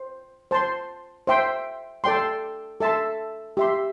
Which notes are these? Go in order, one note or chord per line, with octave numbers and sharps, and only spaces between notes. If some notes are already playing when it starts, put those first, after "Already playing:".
Already playing: C5
C5 A5 C6
C5 E5 G5 C6
A4 D5 G5 C6
A4 E5 A5 C6
G4 E5 C6